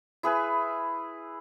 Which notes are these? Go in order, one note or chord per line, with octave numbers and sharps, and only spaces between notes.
E4 G#4 B4